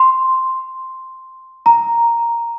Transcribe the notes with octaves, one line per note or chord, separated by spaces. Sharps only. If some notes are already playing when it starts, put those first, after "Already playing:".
Already playing: C6
A#5